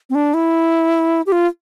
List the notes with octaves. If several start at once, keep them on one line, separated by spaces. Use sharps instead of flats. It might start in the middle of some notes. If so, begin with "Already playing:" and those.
C4
D4
E4
G4
F4